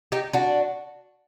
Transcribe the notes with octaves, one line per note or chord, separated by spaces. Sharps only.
D#4 G4
D4 F#4